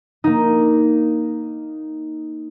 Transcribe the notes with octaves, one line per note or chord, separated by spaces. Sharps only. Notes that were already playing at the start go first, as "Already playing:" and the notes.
A#3 D#4